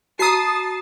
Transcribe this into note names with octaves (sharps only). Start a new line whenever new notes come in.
F#4 A5 A#5 D#6 C7